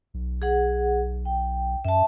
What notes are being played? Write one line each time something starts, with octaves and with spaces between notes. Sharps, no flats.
B1
G#4 F#5
G5
F#2 E5 A5